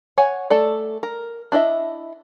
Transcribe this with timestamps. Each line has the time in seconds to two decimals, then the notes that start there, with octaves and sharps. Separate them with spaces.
0.18 C#5 F#5 G#5
0.50 A3 A4 D5
1.03 A#4
1.52 D4 E4 D#5 E5